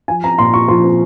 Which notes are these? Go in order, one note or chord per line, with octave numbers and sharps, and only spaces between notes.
F3 G#5
C4 A#5
A#2 C6
F4 C#6
F3 C6
C4